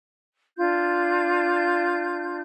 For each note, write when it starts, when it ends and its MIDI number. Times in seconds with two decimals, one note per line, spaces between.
0.56 2.39 62
0.56 2.39 65
0.56 2.39 91